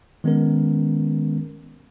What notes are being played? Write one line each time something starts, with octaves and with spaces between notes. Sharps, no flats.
D#3 G#3 B3 C#4 A#4